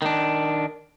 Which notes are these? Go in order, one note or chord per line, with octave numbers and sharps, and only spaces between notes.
D#3 D4